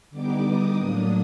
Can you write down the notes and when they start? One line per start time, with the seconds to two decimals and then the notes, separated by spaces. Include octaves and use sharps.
0.10 D3 G3 B3 D#4 D6
0.43 D#6
0.75 A2 F#3 A#3 D4